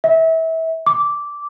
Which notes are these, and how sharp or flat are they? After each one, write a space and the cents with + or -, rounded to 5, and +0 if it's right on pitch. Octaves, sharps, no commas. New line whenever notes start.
E5 -25
D6 -10